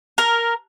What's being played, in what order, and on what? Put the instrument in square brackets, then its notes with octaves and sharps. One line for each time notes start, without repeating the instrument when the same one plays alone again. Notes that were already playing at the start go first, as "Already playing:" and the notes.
[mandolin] A#4